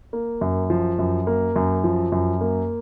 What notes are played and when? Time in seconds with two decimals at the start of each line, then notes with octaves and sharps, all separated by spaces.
0.13 A#3
0.41 F#2
0.70 F3
0.99 F#2
1.27 A#3
1.56 F#2
1.84 F3
2.12 F#2
2.41 A#3